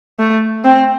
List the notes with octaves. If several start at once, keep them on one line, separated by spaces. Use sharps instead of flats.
A3
C4